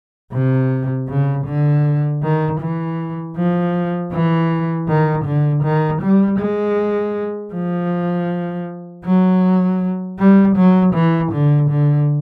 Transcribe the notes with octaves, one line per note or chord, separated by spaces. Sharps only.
C3
C#3
D3
D#3
E3
F3
E3
D#3
D3
D#3
G3
G#3
F3
F#3
G3
F#3
E3
D3
D3